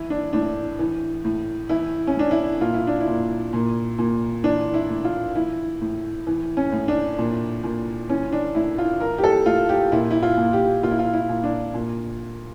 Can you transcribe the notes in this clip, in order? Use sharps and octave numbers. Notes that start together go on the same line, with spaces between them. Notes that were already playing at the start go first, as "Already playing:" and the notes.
Already playing: E3 E4
D4
A2 D4
E3
A2
E3 E4
C#4
A2 D4
E4
A#2 F4
E4
D4
E4
A#2
A#2
A#2
E3 D4
E4
A2
F4
E3 E4
A2
E3
C#4
A2
D4
A#2
A#2
E3 C#4
D4
A2 E4
F4
E3 A#4
G4
A4
A2 F4
G4
A#2 E4
E4
F4
A#2
G4
A#2 F4
E4
F4
E4
A#2
D4
A#2